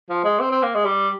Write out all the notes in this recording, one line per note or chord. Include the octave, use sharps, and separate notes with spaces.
F3
G#3
C4
C4
A#3
G#3
G3